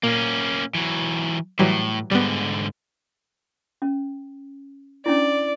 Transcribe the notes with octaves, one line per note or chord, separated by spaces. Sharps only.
A#2 A#3 C#4
E3 F#3
A2 E3 F#3 G3
G#2 D3 G3 B3
C#4
C#4 D4 E4 D5